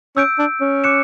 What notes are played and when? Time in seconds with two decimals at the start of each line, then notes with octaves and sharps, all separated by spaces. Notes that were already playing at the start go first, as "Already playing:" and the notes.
0.16 C#4 E6 G6 D7
0.39 D4
0.61 C#4
0.84 D6 F#6 C#7 E7